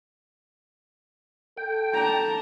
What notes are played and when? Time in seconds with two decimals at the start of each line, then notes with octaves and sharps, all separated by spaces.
1.57 A4 G5
1.94 D4 A5 A#5